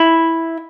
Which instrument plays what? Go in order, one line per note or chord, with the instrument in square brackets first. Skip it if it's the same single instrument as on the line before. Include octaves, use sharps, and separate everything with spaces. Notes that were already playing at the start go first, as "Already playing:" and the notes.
Already playing: [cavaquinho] E4